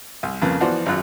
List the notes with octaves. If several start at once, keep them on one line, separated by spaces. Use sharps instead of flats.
C2
F2 C#3 A#3 B4
E3 F3 B3 F#4 C5 D5
G#1 F#2 F4 F#6